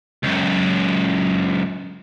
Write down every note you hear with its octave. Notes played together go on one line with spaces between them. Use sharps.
C#2 F#2